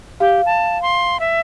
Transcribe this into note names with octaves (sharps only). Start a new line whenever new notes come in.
G4 F5
A5
C6
E5